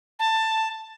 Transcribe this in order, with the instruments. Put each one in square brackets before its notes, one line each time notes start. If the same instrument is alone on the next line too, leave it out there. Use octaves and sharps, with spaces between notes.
[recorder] A5